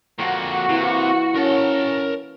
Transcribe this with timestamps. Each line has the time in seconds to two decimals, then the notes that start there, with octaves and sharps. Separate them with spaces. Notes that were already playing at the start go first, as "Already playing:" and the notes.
0.19 F2 A#3 C4 F#4 A5
0.69 C3 E3 A#3 E4
1.36 C#4 A#4 A5